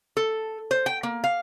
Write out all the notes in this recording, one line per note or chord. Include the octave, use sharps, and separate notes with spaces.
A4
C5
G5
A#3
F5